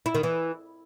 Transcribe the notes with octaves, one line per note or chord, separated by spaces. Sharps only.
E4
D#3
E3